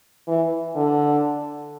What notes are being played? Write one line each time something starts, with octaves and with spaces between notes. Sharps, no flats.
E3
D3